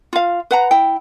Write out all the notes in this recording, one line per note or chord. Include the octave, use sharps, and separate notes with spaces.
F4 F5
B4 F#5 A#5
E4 G5